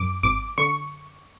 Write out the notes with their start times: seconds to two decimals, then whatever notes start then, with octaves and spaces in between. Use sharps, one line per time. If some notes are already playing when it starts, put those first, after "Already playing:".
Already playing: F#2 D6
0.23 G#1 D6
0.58 D3 C#6